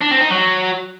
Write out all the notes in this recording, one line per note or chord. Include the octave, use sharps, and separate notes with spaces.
D4
C4
D#4
F#3